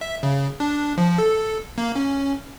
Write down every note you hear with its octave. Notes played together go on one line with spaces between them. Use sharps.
E5
C#3
D4
F3
A4
A#3
C#4